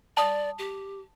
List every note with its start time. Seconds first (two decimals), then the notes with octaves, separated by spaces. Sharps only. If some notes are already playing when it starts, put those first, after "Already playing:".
0.17 D5 A5 D#6
0.59 G4